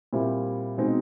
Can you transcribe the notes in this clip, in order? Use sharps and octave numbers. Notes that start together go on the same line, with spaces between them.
A#2 G3 C4 E4
B2 G#3 C4 D#4